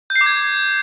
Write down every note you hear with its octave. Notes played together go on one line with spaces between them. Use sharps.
G6
C7
D6
G#6